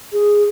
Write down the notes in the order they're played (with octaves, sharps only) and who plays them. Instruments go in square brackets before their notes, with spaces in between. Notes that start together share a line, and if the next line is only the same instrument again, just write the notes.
[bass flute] G#4